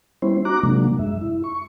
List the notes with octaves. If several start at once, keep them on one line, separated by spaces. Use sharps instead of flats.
G3 B3 C#4 E4 C5
D#4 F#4 A#5 D6 F#6
C3 F3 F#3 G#3 A#3 D4
F#2 G#3 E5
E4
C#6